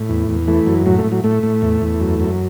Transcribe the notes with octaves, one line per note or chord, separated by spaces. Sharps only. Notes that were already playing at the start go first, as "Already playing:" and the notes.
Already playing: A2
E2
E2
E3 A3
F#2
A2 F#3
A3
A2
F#3
A2 A3
A2
E2
E2
F#2
F#2